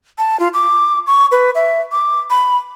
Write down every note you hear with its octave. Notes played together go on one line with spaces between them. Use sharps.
A5
F4
D6
C#6
B4
E5
D6
B5